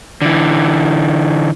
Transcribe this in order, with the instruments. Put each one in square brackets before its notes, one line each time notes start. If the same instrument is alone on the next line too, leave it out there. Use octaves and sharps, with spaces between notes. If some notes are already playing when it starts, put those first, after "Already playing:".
[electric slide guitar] D3 E3